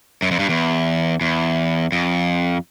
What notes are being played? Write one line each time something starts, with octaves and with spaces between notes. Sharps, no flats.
F#2
F2
G2
E2
E2
F2